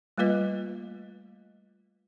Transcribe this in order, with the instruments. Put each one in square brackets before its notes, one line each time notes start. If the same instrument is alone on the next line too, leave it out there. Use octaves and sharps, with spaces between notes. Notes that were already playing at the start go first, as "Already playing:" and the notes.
[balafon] G3 A3 A#3 F4 B4 D#5